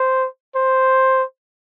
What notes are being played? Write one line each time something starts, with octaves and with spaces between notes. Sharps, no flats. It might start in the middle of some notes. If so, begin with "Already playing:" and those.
Already playing: C5
C5